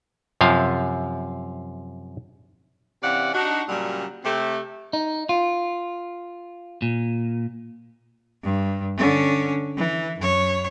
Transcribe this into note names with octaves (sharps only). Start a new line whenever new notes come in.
F#2 C3 F3 F5
C3 E3 C#4 D5 F5 F#5
D4 D#4 F#4
A#2 C#3 F#3 G3
C3 A3 G4
D#4
F4
A#2
G2
D3 C#4
E3
F#2 C#5